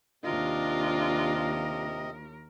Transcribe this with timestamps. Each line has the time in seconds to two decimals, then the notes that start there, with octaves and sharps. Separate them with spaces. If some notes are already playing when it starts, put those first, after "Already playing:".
0.24 D#2 C3 D4 F4 A#4 D#5